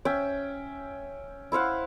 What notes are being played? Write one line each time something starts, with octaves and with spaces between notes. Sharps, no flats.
C#4 E5 G5
E4 C5 F5 F#5